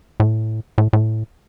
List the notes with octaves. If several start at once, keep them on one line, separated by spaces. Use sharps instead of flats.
A2
A2
A2